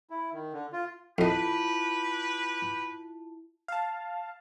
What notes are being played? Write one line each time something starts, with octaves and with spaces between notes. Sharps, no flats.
E4
D#3
D3
F4
F2 E4 F4 G4 B4 D#5 A5
F5 A5